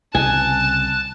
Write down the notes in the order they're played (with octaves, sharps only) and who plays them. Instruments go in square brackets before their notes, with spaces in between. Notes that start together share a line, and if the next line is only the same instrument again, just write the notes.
[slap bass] C2 C#3 [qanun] G#5 [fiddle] A5 [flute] F#6